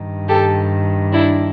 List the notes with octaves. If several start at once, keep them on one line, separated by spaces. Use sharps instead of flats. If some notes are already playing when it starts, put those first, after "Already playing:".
Already playing: G2 D#3
G4 A4
D4 E4